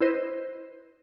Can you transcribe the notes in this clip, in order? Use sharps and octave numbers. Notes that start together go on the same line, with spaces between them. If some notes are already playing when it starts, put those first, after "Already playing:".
E4 B4 C5 D#5